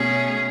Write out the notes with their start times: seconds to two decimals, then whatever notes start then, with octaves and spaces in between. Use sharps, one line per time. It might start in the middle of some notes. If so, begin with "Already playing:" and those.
Already playing: B2 A3 C#4 G#4